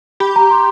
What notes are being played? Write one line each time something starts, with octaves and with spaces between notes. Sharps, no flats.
G4 B5
A#5
C6